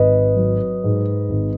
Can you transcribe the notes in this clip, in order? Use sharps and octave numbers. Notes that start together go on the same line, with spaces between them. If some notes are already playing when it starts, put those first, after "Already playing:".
Already playing: G#1 B4 D#5
F#3
G#2
G#1